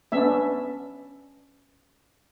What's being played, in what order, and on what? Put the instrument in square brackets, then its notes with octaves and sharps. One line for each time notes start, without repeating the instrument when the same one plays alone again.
[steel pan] B3 C#4 D4 E5